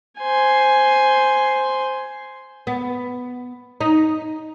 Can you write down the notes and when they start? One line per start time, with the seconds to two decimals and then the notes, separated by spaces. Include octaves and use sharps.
0.19 C5 G#5
2.67 B3
3.81 D#4